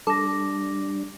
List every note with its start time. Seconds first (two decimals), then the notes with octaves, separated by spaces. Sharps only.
0.07 G3 D4 A4 D6 A#6